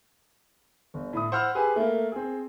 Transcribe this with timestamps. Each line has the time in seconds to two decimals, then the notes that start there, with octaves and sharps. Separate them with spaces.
0.94 G1
1.13 A2 B5 D#6
1.32 C5 F#5 B5 E6 F6
1.55 G4 G#4 B4 G#5
1.76 A3 A#3
2.12 C4 G#4